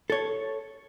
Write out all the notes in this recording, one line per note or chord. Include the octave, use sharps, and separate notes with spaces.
A4 C#5